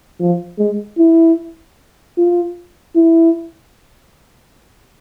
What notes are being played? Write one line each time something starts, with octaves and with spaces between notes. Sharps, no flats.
F3
G#3
E4
F4
E4